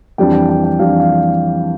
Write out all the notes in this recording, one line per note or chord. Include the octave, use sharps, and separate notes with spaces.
F2 E3 G3 D4 G5
G5
G5
G5
F2 E3 G3 D4 F5
F5